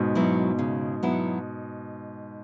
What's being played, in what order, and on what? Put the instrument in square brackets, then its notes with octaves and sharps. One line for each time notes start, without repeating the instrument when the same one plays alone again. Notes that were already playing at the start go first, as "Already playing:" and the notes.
Already playing: [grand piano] G#2 B2
[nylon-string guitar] F#3 B3 E4
C#3
F#3 B3 E4